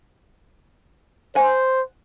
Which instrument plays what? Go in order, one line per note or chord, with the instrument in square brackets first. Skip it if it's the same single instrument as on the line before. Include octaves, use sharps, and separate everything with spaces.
[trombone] C5 [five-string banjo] F#5 G#5